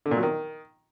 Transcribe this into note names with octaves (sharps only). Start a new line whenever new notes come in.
D3
A#2
F#3
D#3